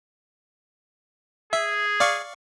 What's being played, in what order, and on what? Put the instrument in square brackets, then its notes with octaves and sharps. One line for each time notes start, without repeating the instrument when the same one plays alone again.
[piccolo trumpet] G#4 [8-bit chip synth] E5
[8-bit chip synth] D5 F5 C#6